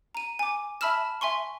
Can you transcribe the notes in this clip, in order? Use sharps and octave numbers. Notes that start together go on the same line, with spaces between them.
A#5 D#7
G#5 D6
E5 A5 B5 E6 F6 E7
E5 G#5 C6 C#6